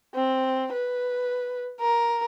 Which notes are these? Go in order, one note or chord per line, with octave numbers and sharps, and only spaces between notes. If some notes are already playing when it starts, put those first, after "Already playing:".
C4
B4
A#4